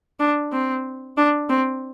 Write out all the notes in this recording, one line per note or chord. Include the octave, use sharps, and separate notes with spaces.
D4
C4
D4
C4